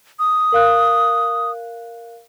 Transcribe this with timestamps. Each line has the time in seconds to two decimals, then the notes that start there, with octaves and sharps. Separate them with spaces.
0.19 D#6
0.52 A#4 F5 F#6